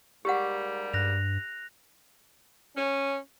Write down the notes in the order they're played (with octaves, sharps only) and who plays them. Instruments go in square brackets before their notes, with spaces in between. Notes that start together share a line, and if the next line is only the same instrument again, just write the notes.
[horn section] G#2 G3 A#3 [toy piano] G4 F#5
[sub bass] G2 [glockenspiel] F#6 A#6 F7
[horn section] C#4